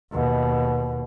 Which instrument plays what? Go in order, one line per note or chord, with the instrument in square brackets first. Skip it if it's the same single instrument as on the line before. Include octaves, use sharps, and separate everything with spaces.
[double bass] D#2 B2